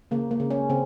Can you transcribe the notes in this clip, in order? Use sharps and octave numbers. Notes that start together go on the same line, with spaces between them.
C#3 A#3
A#3
C#3
C#4
C#3 C4